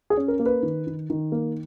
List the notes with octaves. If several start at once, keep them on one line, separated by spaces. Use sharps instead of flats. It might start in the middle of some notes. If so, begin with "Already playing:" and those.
G#4
C#4
A#4
A#3
B4
D#3
D#3
D#3
A#3